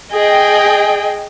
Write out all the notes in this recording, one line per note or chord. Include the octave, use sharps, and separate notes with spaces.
G#4 D#5 G5